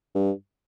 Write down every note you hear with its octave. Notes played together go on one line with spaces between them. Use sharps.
G2